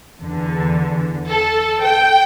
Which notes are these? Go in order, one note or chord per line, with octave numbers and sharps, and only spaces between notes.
E2 D3
A4
G5